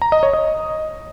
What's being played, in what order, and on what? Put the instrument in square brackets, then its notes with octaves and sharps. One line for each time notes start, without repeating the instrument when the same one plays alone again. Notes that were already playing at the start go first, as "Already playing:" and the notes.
[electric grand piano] A#5
D#5
C#5
D#5